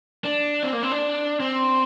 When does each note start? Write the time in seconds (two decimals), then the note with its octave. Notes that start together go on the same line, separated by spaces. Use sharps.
0.25 D4
0.63 C4
0.73 A#3
0.83 C4
0.91 D4
1.40 C4